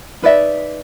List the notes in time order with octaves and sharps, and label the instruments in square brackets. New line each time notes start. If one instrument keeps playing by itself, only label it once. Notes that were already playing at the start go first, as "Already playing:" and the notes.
[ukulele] D#4 B4 D5 E5